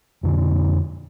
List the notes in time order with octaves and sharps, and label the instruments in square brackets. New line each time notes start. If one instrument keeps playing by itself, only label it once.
[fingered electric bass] F2 B2 D3